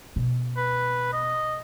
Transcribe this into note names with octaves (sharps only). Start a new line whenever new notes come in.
B2
B4
D#5